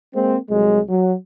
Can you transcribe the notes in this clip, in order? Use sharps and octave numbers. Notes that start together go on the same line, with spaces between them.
G#3 A#3 C4
C2 F#3 G#3
F#3